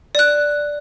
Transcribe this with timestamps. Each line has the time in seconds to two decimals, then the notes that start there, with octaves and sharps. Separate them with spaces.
0.15 D5 F#6